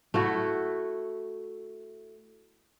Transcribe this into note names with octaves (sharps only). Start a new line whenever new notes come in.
A3 E4 F#4